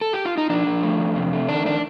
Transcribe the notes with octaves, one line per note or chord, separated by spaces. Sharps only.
A4
G4
F4
D#4
F3 D4
F3
A3
F2
C3
A3
D#3 D4
D#3 D4